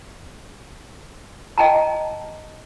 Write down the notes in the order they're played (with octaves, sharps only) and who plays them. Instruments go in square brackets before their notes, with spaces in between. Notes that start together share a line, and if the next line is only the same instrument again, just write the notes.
[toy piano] D#5 G5 A5 A#5